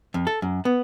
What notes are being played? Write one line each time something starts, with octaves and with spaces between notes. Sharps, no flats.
F2
A4
F#2
B3